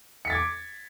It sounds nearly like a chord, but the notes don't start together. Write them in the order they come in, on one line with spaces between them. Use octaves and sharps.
C#7 B6 A6 G#6 D6